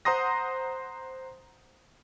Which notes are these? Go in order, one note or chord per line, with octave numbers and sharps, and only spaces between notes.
C5 F#5 A#5 C6 D#6 A#6